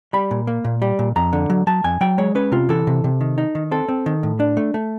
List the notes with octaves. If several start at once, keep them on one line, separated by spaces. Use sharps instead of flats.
G3 B5
A#2
A#3
A#2
G3
A#2
F2 A#5
D3
F#3
F#3 A5
F2 G#5
F#3 G5
G#3 C#5
C#4 B4
C3 F4
E3 A4
C3
C3
D#3
D#4
D#3
C4 A4
C4
D#3
A2
D4
A3
A3